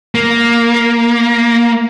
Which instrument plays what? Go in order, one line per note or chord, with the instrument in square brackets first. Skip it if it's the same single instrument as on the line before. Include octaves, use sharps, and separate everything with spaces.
[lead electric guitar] A#3